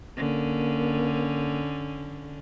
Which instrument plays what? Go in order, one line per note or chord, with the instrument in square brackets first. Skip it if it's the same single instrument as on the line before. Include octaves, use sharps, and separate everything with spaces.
[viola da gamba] D3 C#4 [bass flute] A#3